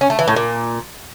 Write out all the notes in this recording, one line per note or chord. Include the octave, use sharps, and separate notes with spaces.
C#4
A3
E3
A2
A#2